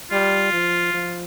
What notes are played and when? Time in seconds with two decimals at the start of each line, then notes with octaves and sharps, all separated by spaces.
0.11 G3 F4
0.53 F3
0.94 F3